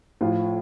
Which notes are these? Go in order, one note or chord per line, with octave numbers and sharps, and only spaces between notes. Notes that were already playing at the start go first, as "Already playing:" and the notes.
A2 F3 F4